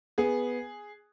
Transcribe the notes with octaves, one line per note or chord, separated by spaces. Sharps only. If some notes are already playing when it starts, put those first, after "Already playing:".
B3 G#4